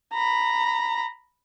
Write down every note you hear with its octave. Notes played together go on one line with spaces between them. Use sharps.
A#5 B5